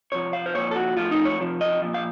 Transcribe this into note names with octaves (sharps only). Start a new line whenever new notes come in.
C3 F3 C#5
F5
C5
A#2 F3 C#5
A4
F#4
A2 F3 F4
D#4
C#5
C3 F3
D#5
A#2 F3
F5